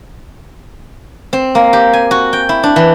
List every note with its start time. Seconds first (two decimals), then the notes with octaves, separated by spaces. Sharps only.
1.33 C4
1.55 A#3
1.73 G4
1.93 G#5
2.11 F#4
2.33 G5
2.49 E4
2.63 D4
2.76 E3